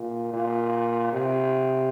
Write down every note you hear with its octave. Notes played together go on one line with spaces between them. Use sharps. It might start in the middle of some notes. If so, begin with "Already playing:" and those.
Already playing: A#2
A#2
C3